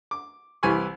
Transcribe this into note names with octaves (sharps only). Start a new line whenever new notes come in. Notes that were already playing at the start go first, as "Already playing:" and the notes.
D6
C2 E3 G4 G#5 B5 C#6